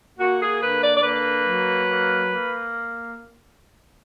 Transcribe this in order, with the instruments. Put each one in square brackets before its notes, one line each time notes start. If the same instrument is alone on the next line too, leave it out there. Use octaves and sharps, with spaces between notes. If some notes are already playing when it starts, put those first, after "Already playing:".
[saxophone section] A#3 F#4
G#4
D3 B4
D5
D5
A#3 B4
F#3
A#3
A#3